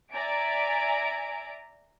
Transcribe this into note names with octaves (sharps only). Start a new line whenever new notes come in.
D5 E5 G#5 A#5 D7